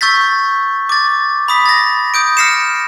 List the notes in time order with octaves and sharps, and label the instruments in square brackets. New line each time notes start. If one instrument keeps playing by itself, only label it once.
[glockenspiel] C#6 E6 G6 A6 B6
D6 A6
B5 D#6 B6
A6 A#6
D#6 G6 D7
F6 A#6 C7 C#7 E7